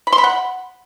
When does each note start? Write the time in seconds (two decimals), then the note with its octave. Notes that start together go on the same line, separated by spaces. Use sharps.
0.07 B5
0.13 C6
0.18 B5
0.24 F#5